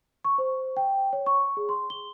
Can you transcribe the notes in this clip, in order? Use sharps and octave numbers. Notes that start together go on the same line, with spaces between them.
C#6
C5
G5
C#5
C#6
G#4
C6
G7